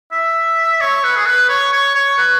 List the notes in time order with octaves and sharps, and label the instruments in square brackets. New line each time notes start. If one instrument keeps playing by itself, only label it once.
[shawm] E5
C#5
B4
G#4
B4
C#5
C#5
C#5
B4